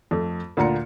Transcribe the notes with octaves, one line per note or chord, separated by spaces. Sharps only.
F2 A3
D2 A#2 F4 A#5 C#7